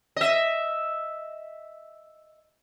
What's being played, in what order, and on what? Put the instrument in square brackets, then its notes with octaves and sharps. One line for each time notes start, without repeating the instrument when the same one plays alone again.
[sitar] D#5 E5